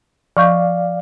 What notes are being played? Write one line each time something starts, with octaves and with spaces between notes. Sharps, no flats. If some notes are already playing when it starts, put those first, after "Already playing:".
F3 D5 F5 C#6 G6